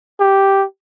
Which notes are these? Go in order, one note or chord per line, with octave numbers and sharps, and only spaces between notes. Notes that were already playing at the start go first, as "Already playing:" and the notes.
G4